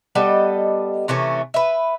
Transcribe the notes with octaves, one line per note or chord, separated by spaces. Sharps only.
G3 B3 A4 D#5
C3 E3 A3 C#4
B4 E5